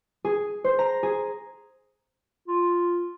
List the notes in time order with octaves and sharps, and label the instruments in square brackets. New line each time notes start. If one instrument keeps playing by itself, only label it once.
[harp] G#4
C5
A#5
G#4
[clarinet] F4